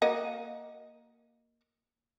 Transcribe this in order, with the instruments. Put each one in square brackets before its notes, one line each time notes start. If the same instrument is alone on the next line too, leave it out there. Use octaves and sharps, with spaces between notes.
[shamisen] A#3 F#4 D#5